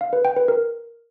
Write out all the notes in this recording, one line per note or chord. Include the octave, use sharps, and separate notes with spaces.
F5
B4
G5
B4
A#4